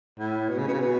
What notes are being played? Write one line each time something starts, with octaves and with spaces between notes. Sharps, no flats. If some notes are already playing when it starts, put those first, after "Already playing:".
A2
B2
C#3
B2
C#3
B2